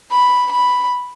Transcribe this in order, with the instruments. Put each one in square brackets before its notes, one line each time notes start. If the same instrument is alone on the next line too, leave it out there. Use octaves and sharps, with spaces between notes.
[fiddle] B5
B5